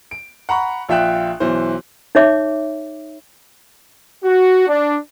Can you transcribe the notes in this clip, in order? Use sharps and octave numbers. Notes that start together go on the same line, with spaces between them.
D7
F#5 A#5 B5 C#6
A#1 F4 E5 G5 F#6
B1 E3 C5
D#4 G#4 C#5 E5 D6
F#4
D4